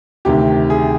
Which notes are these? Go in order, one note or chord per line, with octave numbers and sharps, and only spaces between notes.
D2 C3 D#3 G4
G#4